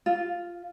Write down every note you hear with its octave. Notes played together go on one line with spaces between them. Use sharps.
F4